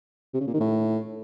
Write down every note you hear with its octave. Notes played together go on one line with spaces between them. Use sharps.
C3
C#3
A#2
D#3
A2